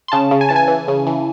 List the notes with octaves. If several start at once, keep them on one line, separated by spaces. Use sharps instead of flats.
C6
C#3 A5
C#3
G#5
E3 A5
G#5
E3
C#3
E3